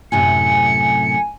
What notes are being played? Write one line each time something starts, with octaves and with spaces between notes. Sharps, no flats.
F#2 A2 C3 G#5 C#7